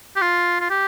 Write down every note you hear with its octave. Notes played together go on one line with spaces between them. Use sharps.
G4
F4
F4
G4